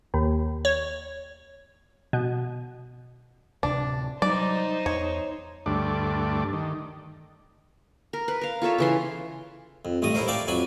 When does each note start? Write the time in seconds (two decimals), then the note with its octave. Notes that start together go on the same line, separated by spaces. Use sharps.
0.14 D#2
0.65 C#5
2.13 B2
3.63 D1 C3 D4
4.22 F#3 G3 D#4 C5 D5
4.86 E2 C#5
5.66 D2 G2 A3 D5
6.53 D#3
8.13 A#4
8.28 B4
8.41 A#4 F5
8.62 F4 A4 C#5 E5
8.78 C#3 E3 C6
9.85 F2
10.02 A1 G2 A3 D#5 D#6
10.15 A2 E4 A#4 C5
10.28 D5 E5 F5 G5 A5
10.48 F2 F#3 G#5 B5